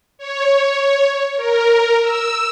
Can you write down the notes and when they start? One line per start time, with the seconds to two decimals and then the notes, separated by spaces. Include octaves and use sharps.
0.18 C#5
1.37 A#4
2.02 E6